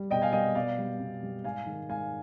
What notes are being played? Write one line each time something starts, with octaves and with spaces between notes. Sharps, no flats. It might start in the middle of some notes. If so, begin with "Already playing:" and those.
Already playing: G3
B2 D#5 G5
F5 G#5
G3 D#5 G5
B2 D5 F5
G3
B2
G3
G#2 F5 G#5
D#3 G#3
G#2 F5 G#5